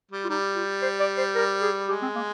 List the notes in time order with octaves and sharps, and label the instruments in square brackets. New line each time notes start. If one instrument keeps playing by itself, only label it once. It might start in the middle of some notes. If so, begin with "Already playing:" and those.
[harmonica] G3
[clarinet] F4
[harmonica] G3 [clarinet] D#4
[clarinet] F4
C5
D5
C5
A#4
G#4
[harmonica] G#3 [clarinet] G4
[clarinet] C4
A#3